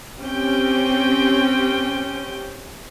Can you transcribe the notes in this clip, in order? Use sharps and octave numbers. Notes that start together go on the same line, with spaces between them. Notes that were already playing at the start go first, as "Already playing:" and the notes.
C4 C#4 G4 G5